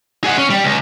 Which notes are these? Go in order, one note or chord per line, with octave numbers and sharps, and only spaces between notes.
G#4 F#5
C#4
G3
C#2